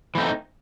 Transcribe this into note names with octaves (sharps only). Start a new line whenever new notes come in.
E3 A3 C4 D#4